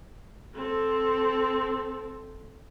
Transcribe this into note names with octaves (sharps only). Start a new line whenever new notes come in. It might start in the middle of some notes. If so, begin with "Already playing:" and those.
C4 A4